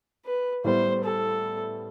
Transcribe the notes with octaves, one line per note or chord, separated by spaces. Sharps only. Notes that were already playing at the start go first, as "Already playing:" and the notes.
B4
A2 G3 B3 E4 C5
A4